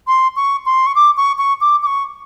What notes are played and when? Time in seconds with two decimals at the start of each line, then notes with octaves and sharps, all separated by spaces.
0.07 C6
0.36 C#6
0.66 C6
0.86 C#6
0.95 D6
1.17 C#6
1.38 C#6
1.61 D6
1.82 D6
1.86 C#6